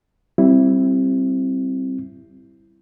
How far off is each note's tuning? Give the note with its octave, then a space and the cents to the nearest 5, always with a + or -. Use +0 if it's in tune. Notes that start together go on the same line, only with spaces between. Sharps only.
G3 -15 C4 +10 E4 +10